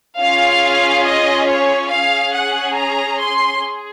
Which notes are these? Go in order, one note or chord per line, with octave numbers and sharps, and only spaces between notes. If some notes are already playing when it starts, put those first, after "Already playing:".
C#4 F4 G#4 F5
D#5
C#5
C#4 G#4 F5
F#5
A#5
C6
G#4